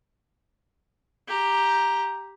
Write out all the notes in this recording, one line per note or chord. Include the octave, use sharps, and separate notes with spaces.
G4 A#5